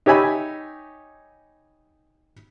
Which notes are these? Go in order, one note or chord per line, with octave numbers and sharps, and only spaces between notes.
D#4 G4 C#5 E5 G#5 B5